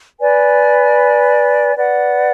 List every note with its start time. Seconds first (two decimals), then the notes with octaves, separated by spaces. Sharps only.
0.19 B4 D5 G#5
1.77 B4 D5 F#5